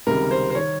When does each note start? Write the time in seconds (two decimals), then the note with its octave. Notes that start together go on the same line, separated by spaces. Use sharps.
0.07 C#2 C3 D#3 G3 A#4
0.31 C5
0.50 C5
0.55 D#3 C#5